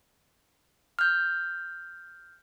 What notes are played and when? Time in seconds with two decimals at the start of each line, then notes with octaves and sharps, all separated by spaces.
0.99 F6 G6